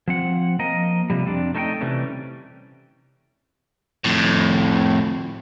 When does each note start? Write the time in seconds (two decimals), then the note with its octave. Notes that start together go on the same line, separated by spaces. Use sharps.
0.08 F3 C4 F#5
0.59 F3 A#3 A#4 D#5
1.10 C3 F3 G3
1.25 F2 C4 D4 D5
1.55 A3 D#4 E4 A4 D#5 G5
1.81 C3 E3 G3 A3 C#4
4.04 F2 A2